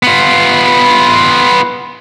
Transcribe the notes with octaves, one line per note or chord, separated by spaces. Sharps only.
B3 F4